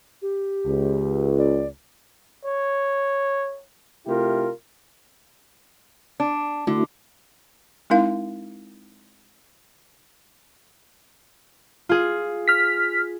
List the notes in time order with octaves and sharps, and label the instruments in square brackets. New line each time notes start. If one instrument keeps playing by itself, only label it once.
[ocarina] G4
[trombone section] C#2
[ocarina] D5
[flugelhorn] C#5
[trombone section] C3 A3 E4 F4 G4 A#4
[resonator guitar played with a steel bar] D4
[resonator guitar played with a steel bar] D3 [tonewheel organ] A3 E4 F#4
[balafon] G#3 C4 D#4 E4 A#4 F5
[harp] F4 G#4
[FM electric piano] F6 B6